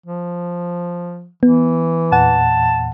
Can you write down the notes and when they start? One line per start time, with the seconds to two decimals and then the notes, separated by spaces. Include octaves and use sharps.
0.06 F3
1.43 E3 B3
2.12 E2 A#2 F#5 A5